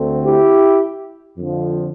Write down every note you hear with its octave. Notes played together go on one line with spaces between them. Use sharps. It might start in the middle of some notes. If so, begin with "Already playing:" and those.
Already playing: D2 D3 A3 C4
E4 G4
F2 D3 F3